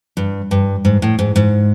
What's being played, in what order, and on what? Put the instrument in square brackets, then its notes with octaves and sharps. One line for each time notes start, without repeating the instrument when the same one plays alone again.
[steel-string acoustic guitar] G2
G2
G#2
A2
G#2
G#2